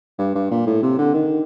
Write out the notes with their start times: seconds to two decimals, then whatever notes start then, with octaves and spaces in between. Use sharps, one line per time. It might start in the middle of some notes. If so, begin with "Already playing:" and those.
0.18 G2
0.35 G2
0.51 A#2
0.66 A2
0.83 C3
0.98 D3
1.14 D#3